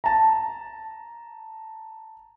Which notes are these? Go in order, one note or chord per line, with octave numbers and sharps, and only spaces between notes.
A5 A#5